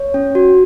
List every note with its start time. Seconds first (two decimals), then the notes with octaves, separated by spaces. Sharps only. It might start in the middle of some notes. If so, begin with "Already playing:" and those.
Already playing: C#5
0.14 C#4
0.35 F#4